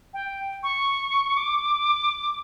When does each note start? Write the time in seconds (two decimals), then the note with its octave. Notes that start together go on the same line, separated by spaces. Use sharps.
0.14 G5
0.63 C#6
1.37 D6